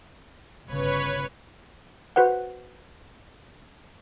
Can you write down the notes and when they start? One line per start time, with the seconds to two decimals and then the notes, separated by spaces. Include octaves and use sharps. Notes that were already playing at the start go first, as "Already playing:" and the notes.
0.67 G1 C#3 B4 C#5
2.16 F#4 B4 C5 F#5